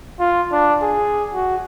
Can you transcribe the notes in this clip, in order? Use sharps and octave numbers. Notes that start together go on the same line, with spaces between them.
F4
D4
G#4
F#4